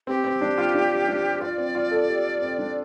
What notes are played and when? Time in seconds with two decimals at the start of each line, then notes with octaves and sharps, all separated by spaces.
0.07 C4 G4
0.24 C4
0.41 D4
0.58 F4
0.74 D4
1.08 D4
1.41 F4 D5
1.58 C4
1.75 F4
1.91 A4
2.08 G4
2.41 C4
2.58 D4